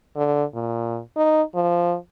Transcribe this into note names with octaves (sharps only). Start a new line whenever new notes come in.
D3
A#2
D#4
F3